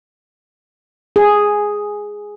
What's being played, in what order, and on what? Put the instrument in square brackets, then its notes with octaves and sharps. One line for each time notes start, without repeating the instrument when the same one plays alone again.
[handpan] G#4